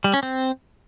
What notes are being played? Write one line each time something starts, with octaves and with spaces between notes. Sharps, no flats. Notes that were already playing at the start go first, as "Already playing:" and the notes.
G3
C#4
C4